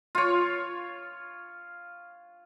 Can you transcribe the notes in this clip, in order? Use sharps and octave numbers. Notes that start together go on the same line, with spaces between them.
F4 C#5